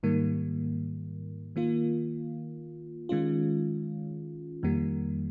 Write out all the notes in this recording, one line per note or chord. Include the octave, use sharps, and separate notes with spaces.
G#2 D#3 G3 A#3
D#3 A#3 F4
D#3 G#3 C#4 F4
F2 D#3 G3 A#3